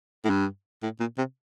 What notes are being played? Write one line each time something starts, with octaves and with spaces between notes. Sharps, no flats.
A2
G2
A2
A#2
C3